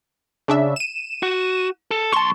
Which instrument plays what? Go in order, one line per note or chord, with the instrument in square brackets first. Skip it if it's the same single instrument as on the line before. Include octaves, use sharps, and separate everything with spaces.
[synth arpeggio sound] C#3 D4 E5
D#7 E7
[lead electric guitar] F#4
A4
[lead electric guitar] B1 C6 [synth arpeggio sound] A5 C#6